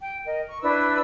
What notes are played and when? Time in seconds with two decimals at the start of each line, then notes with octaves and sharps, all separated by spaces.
0.01 G5
0.25 A#4 D#5
0.48 C#6
0.63 D4 E4 B4 E6